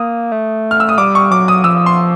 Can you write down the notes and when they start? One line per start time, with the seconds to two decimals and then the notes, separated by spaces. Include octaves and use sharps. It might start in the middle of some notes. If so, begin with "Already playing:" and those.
Already playing: A#3 D#6
0.32 A3
0.71 F6
0.80 E6
0.89 D#6
0.98 G3 D6
1.15 C#6
1.31 F#3 D6
1.48 D#6
1.64 F3 E6
1.86 C6